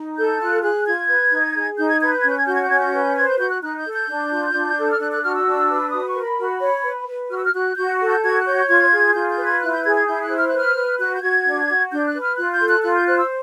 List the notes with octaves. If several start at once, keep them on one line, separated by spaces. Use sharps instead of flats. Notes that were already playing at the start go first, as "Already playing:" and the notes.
Already playing: D#4
A4 G6
F4 F#6
G#4 F#6
F4 G#6
B4
D#4
G#4
D#4 G6
G#6
B4 G#6
G6
C#4 G#6
G6
G#6
F#4 G6
G#6
G6
C#4 G#6
G6
B4
C5 G#6
G6
F#4 G6
F#6
D#4 F#6
G6
A4
G6
D4
F4
D4
A4
F6
D4 F#6
F#6
F#4 F6
E6
D4
B4
F#4 D#6
C#6
A#4
B5
F#4
C#5
B4
B4
F#4 F6
E6
F6
F#4 F#6
F#4 G6
A4
G6
F#4 G#6
F#6
C#5 G6
F4 G#6
G#4
F4 G6
G6
B4
G#6
E4 F#6
G6
G#4 G#6
G#6
E4 G6
F#6
C5
F6
F#6
B4 F6
B4
F#4 F#6
G6
F#4 G#6
D4
F#4
D4 G6
F#6
B4
F6
F4 F#6
G6
A4
F#6
F4 F#6
G6
C5 F#6
E6